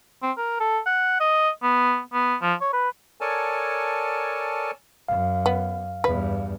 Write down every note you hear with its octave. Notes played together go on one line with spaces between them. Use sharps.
C4
A#4
A4
F#5
D#5
B3
B3
F3
C#5
B4
A4 A#4 C#5 D5 G#5 A5
F#2 F5
B3
E2 G2 B4